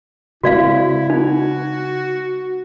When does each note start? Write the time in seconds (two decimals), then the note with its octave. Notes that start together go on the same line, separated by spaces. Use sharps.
0.43 C#3 G#3 C4 E4 F#4 D5 F5
1.10 D#4 F#4